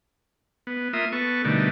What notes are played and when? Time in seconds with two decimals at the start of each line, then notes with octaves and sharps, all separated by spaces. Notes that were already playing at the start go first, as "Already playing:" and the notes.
0.67 B3
0.93 A#3 F4 E5 D#6
1.12 B3 A4 C#6
1.44 B2 D3 D#3 G3 A3